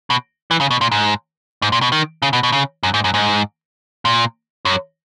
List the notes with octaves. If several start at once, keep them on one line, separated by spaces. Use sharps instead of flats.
B2
E3
C#3
B2
A#2
G#2
G#2
A#2
B2
D#3
C#3
B2
B2
C#3
F#2
G#2
F#2
G#2
A#2
F#2